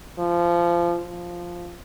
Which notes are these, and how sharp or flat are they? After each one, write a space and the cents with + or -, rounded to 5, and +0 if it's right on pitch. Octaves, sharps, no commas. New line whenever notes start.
F3 -20
F3 +0